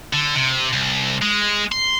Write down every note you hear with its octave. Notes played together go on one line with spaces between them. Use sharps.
D3
C3
C2
G#3
C6